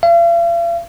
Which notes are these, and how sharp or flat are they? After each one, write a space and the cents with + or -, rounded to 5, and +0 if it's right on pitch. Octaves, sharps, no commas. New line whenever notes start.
F5 -45